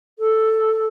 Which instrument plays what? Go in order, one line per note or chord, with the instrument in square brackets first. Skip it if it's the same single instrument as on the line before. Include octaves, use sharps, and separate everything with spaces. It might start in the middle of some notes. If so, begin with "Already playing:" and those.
[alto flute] A4